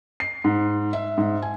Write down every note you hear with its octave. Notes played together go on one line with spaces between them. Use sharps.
C7
G#2
E5
G#2
G#5